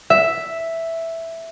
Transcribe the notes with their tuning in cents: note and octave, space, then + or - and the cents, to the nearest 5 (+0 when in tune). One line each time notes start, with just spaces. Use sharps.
E5 +0